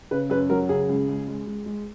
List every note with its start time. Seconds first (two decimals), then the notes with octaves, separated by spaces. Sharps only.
0.11 C#3 B4
0.30 F#2 B4
0.50 F#3 A#4
0.69 C#3 G#4
0.88 C#2
1.08 C#2
1.28 G#3
1.47 G#3
1.66 G#3